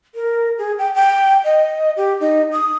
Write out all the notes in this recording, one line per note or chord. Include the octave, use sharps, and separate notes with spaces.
A#4
G#4
G5
G5
D#5
G4
D#4
D#6